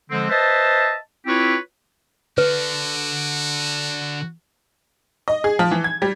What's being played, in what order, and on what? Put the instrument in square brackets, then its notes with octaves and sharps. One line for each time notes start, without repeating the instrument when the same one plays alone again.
[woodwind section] D3 F3 G#3 C4
B4 C5 D#5 E5 A5
C4 E4 F4 G4 B4 C#5
[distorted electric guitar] D3 [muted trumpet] F#4 [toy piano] B4
[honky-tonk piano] D#5
G#4
F3
E3
G#6
G3